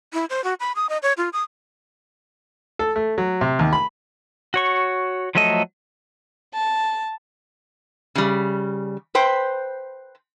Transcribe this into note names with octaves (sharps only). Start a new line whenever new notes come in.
E4
C5
F#4
B5
D#6
D#5
C#5
F4
D#6
A4
A3
F#3
C3
D#2
B5
F#4 C#5 C#6
F3 F#3 A3 A4 D#5
A5
C#3 G3
B4 C5 G5